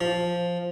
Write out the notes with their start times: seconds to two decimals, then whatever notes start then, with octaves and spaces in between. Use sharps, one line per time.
0.01 F3